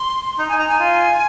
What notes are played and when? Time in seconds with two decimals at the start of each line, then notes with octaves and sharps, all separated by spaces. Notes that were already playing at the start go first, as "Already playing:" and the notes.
Already playing: C6
0.38 D#4 A#5
0.49 G#5
0.58 D#4 A#5
0.69 G#5
0.79 F4